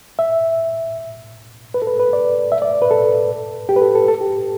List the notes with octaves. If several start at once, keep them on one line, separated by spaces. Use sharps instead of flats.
E5
B4
A4
B4
B4
D5
E5
D5
B4
A4
G4
B4
A4
A4
A4
G4